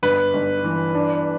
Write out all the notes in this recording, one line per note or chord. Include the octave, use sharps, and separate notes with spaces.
G1 B4
G1
E3
D4